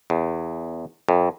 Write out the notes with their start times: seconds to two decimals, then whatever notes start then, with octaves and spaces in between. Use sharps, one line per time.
0.10 E2
1.09 F2